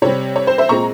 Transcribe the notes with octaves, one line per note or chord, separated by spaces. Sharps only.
C3 G3 C4 C#5
C#5
C5
C5 E5
A#2 G#3 C4 A#5 C#6